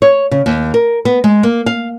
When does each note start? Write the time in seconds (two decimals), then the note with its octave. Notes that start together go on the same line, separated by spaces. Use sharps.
0.02 C#5
0.31 C#3
0.46 D#2
0.74 A#4
1.05 B3
1.24 G#3
1.43 A#3
1.66 F5